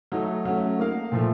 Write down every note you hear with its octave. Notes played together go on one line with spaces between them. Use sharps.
F#3 A3 D#4
F#3 A3 C#4
A#3 D#4 A#4 F5
A#2 F3 A3